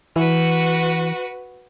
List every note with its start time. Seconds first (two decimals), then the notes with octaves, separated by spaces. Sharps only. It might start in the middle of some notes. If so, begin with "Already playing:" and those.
0.16 E3 F#4 B4